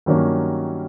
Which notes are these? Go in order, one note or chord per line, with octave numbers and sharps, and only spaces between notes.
G2 D#3 F#3 A#3 C#4